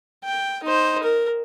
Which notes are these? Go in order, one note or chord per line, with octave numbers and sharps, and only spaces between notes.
G5
D#4 C5
A#4